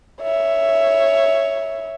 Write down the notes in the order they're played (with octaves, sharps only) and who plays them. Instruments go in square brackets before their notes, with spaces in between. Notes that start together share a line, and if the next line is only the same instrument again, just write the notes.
[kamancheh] C#5 E5